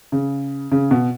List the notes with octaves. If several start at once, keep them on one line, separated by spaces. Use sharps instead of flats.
C#3
C#3
B2